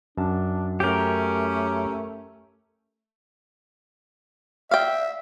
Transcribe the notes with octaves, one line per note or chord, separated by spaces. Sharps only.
F#2 D4 A5
A3 C#4 G4 A#4
E5 F5 G5